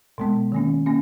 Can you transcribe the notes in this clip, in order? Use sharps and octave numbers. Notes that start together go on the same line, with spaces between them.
B2 G#3 B3
D#3 A#3 C#4
A#3 C#4